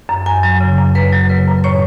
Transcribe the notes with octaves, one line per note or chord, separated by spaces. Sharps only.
F#2
F#2 G#5
F#3
C#3
F#2
F#2 B4
F#3
C#3 B4
F#2
A2 C#5